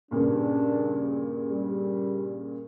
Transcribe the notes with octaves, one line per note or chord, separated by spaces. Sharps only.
G2 A#2 C#3 D4
G3